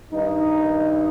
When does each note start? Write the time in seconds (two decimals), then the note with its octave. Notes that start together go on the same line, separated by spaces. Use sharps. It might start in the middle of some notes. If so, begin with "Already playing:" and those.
0.12 G2 D#3 D#4